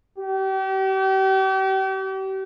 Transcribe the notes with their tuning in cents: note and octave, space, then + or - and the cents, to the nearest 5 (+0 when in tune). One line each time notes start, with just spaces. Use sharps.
G4 -40